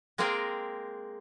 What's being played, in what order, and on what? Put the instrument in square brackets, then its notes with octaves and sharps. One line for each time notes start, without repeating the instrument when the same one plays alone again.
[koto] G#3 A#3 C4 G#4 A#4 G5